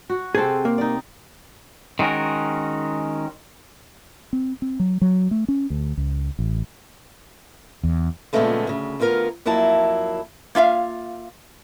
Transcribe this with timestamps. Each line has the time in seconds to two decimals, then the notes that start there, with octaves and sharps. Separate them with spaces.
0.10 F#4
0.35 C3 C4 G#4 A4
0.65 A#3
0.78 D#4 D5
1.99 D#3 G#3 C#4 F#4 A#4
4.33 C4
4.62 C4
4.80 F#3
5.01 F#3
5.31 A3
5.48 C#4
5.70 D2
5.97 C#2
6.39 A1
7.84 E2
8.33 A#2 C#3 F3 G#3 A3 B3
8.67 D2 C#3
9.00 D2 B3 F4 A#4 F5
9.45 F2 F#3 A#3 E4 A5
10.55 A#3 F4 E5 F5